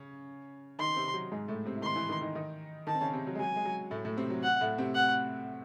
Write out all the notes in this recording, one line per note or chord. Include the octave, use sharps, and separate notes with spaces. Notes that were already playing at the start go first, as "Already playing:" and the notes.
Already playing: C#3 C#4
D#3 D#4 C6
C3 C4
F#3
G#2 G#3
A2 A3
C3 C4
E4
D#3 D#4 C6
E3 E4
D#3 D#4
D#3 D#4
D#3 D#4
D#3 D#4 A5
C4
C#3 C#4
C3 C4
F#3
G#3
F#3 G#5
G#3
F#3
A2 A3
A2 A3
C3 C4
F#3
F#5
A2 A3
C3 C4
F#5